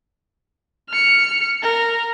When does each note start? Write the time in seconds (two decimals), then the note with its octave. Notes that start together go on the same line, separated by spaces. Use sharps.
0.90 F6 C#7
1.63 A#4